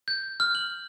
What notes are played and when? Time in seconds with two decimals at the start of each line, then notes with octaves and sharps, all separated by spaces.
0.08 G6
0.40 F6
0.55 F#7